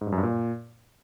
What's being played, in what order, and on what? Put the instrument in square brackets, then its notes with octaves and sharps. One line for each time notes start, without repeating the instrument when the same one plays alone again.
[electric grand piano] G#2
G2
F#2
G2
A#2